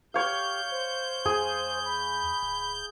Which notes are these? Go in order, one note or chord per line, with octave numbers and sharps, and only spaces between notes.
G4 C#5 F5 G6
C5
E2 G#4
B5
D1